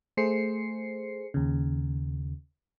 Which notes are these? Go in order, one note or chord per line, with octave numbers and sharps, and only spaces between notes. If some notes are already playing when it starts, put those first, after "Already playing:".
A3 G#4 C5 C7 C#7
D#2 C#3